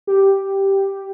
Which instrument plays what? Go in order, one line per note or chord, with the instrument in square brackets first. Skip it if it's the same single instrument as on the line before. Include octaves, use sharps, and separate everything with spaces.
[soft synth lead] G4